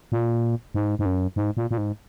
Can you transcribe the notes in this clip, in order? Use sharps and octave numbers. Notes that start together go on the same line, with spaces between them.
A#2
G#2
G#2
F#2
G#2
A#2
A#2
G#2